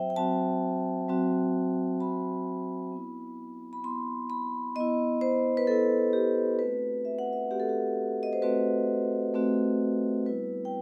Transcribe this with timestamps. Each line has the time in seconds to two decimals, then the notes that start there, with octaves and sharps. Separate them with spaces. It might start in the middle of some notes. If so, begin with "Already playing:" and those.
Already playing: F#3 C4 F#4 C5 E5 G5
0.10 G5
0.16 F#3 C4 F#4 A5
1.09 F#3 C4 F#4
2.00 F#3 C4 F#4 B5
2.92 B3 E4
3.73 B5
3.83 B3 E4 C6
4.30 B5
4.76 B3 E4 D#5
5.21 C5
5.57 B4
5.67 B3 E4 A4
6.13 G4
6.59 A3 C4 F#4 B4
7.05 E5
7.19 F#5
7.33 E5
7.51 A3 C4 F#4 G4
7.60 A4
7.69 G4
8.23 D#5
8.33 C5
8.42 A3 C4 F#4 B4
9.34 A3 C4 F#4
10.26 G3 B3 E4 B4
10.65 G5